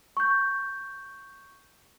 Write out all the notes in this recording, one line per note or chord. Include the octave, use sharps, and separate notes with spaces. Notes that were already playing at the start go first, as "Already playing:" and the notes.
C#6 G6